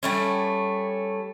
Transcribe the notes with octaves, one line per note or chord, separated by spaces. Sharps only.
G3 A3 C#4